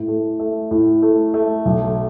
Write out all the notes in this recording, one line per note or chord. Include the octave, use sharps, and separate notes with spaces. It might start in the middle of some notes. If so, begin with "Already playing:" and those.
Already playing: A2
A3
A3
A2
A3
A3
B1